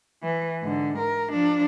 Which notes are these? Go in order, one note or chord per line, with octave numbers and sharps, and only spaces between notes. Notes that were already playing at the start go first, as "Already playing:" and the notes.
E3
G#2 D3
A#4
F3 D4